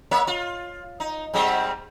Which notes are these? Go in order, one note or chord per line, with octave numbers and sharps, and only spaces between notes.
A#3 C#5 E5
F4
D#4
G#2 G3 C4